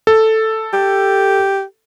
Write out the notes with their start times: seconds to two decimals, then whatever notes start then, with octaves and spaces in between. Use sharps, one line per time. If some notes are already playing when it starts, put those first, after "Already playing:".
0.07 A4
0.73 G4